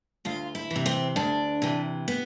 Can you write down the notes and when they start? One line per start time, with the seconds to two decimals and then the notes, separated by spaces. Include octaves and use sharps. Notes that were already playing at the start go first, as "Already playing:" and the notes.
0.25 D2 F4
0.55 E4
0.71 E3
0.76 C3
0.86 C4
1.16 D2 D4
1.62 C3 E3
2.08 B3